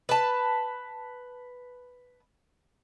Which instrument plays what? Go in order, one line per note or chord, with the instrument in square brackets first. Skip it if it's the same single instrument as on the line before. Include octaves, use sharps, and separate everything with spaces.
[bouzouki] B4 A5